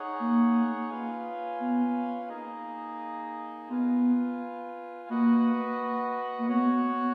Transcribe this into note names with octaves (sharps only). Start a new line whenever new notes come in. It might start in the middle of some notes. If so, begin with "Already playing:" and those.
Already playing: D#4 G#4 C#5 F#5
A#3
C#4 F4 B4 F5 G#5
B3
A#3 D#4 G#4 D#5
B3 F4 B4 F5 G#5
A#3 F#4 B4 D#5 F#5
A#3
B3 F#4 C#5 F#5